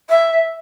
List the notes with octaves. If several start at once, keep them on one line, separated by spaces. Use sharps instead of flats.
E5